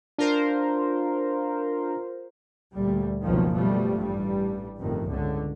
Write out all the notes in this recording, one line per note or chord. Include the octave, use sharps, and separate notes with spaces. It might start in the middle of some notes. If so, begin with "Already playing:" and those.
D4 F4 A#4 C5
D2 A#2 G3
F#1 C#2 B2 D#3 F3
B2 F3 G3 A3
A1 G2 G3
G1 F2 A2 D#3
C#2 D3